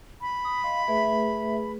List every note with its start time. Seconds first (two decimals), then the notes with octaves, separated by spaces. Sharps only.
0.21 B5
0.44 D#6
0.64 D#5 F5 C6
0.88 A3 G#4 B4 E5